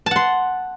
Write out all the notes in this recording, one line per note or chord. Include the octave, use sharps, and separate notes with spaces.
F#5 A5 C6